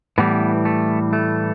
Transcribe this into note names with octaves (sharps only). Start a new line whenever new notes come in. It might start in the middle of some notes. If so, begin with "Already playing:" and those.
A2 E3 G3 B3
A3
A3